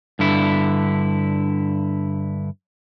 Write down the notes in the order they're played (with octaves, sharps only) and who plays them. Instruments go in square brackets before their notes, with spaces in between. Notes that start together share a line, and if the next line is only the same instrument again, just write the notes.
[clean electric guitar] G2 D3 E4